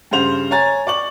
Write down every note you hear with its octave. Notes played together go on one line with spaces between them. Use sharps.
G2 C#3 C5 F7
C#5 G#5 A#5 A6
D5 C#6 F#7